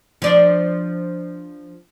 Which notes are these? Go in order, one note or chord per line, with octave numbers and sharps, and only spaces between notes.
F3 D4